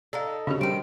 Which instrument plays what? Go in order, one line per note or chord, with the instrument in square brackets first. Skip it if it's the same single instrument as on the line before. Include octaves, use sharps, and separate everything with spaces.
[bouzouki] D#4 A4 [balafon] D5 F5
[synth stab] C#3 C#4 [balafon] D4 F#4 G4
[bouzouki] D#3 C4 [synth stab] G3 [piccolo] D7